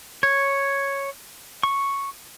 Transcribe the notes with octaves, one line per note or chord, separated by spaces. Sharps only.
C#5
C#6